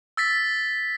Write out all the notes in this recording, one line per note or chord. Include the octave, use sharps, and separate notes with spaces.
E6 A6 B6